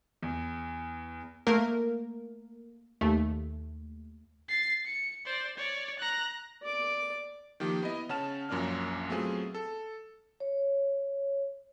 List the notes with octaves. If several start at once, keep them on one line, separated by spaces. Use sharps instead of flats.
E2
A3 A#3 A#4
D#2 A3
A6 C7
C#7
C5 D5
C#5 D5
A#5 F#6
D5 D6
D#3 F3 A#3 G4
B3 E4 D#5
C#3 C#4 F#5 A5 F6 E7
A#1 F#2 A#2 C#4 D4 F6
F#3 A3 B3 C4 F4 G#4
A4
C#5